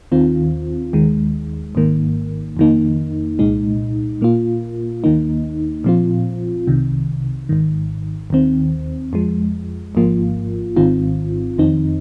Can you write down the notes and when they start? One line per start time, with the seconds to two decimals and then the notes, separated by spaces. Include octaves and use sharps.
0.12 D#2 D#3 C4 F4
0.93 D#2 D#3 G#3
1.75 G#1 G#2 D#3 A#3
2.57 F2 D#3 A#3 D#4
3.39 C2 A#2 G#3 D#4
4.21 A#2 A#3 F4
5.04 D#2 D#3 A#3 D#4
5.84 A#2 F3 C4 F4
6.67 C2 C3 D#3
7.49 G#1 G#2 D#3
8.30 D#2 D#3 C4
9.13 F2 F3 G#3
9.95 G#1 G#2 F3 A#3 F4
10.76 G#1 G#2 D#3 C4 F4
11.58 F2 D#3 C4 D#4